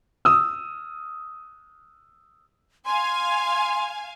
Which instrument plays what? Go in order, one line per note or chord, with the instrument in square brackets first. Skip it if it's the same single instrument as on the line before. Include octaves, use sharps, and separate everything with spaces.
[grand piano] D#6 E6
[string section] F5 G#5 [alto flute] C6